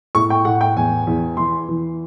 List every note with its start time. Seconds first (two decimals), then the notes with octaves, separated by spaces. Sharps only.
0.15 A2 C#6
0.30 G5
0.45 A2 F#5
0.61 G5
0.76 E2 G#5
1.07 E2
1.37 E3 C6
1.69 E3